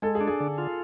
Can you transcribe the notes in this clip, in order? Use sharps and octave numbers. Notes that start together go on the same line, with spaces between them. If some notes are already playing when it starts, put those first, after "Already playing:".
G#3 A4
G#4
D4
G#4
D3
F4